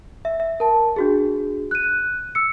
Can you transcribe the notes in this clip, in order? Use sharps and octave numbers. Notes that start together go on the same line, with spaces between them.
E5
E5
A#4 A5
D4 F#4 G#4
F#6 D#7
E6 C#7